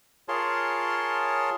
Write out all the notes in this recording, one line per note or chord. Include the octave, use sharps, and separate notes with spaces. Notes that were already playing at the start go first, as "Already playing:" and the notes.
F4 G#4 A#4 C#5 A5 C6